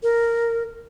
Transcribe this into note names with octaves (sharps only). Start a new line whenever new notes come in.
A#4